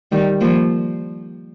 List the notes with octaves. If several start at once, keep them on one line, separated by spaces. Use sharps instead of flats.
D#3 G3
F3 A#3